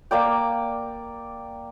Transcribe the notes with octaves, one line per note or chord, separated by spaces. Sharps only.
A#3 D5 G5